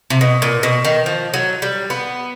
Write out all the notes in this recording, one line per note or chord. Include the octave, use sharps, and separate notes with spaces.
C3
B2
A#2
B2
D#3
F3
F#3
G3
B3